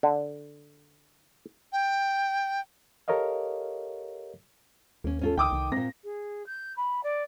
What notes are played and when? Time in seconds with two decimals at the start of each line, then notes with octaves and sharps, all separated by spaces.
0.03 D3
1.72 G5
3.08 G4 A4 A#4 C#5 D#5 F5
5.04 D#2 A#3 C#4
5.21 C#4 F4 A4
5.37 C#2 D#3 G5 D6 D#6
5.52 C2
5.72 A#2 A#3 C4 A#6
6.04 G#4
6.46 G6
6.76 B5
7.03 D5